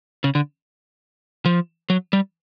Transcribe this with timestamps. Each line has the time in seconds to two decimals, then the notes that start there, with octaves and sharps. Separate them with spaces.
0.24 C#3
0.35 D3
1.46 F3
1.90 F#3
2.13 G3